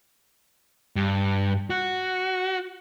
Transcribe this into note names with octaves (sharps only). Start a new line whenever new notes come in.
G2
F#4